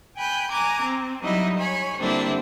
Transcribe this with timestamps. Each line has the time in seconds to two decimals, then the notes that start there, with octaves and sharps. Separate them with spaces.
0.16 G5 G#5 B5 F#6 G6
0.50 G#5 A#5 D6 F#6 G#6
0.82 C4
1.22 F#3 G3 D#4 E4 D#5
1.58 C#5 G#5 B5
1.98 D3 G3 A#3 C4 D4 E4